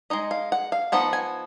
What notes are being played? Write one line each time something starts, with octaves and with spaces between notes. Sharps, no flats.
G#3 D#4 D#5
F5
F#5
F5
F3 B3 D#4 F#5
G#5